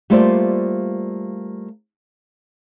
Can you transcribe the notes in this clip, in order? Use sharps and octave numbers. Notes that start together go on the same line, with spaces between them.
G3 A3 A#3 F4 C5 D5